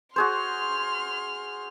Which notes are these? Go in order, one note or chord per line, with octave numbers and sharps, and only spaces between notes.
F#4 G#4 C5 C6 F6